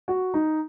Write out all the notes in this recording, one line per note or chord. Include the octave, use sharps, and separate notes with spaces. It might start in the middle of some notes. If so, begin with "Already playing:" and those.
F#4
D#4